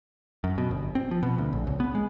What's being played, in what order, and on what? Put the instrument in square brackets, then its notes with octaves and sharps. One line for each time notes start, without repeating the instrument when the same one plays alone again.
[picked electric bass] F#2
B2
G1
C4
F3
B2
D2
A#1
C#2
B3
G#3